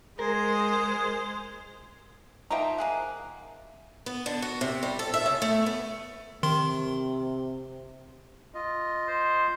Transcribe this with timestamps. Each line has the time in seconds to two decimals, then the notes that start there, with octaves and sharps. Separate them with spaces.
0.19 G#3 G#4 A#4 C5
2.50 F3 A#3 D#4 E5 G5 A#5
2.78 A#3 G#4 F#5
4.06 B3
4.26 D3
4.42 F#4
4.61 C3
4.83 G3
4.99 A4
5.14 E5
5.26 C#3
5.42 A3
5.66 B3
6.43 C3 D#3 C6
8.54 F4 D#5
9.08 C5